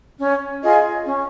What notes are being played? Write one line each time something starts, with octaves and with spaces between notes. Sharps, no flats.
C#4
F4 G#4 D#5
C#4